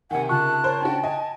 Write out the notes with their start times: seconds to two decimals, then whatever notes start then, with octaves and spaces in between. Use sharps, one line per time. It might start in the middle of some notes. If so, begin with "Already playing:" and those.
0.11 C3 D#3 F#5 G#5
0.29 C#3 F4 A5 C#6 F#6
0.64 A#4 C5 C#5
0.81 C#4 D4 F#4 G5
1.03 D#5 G#5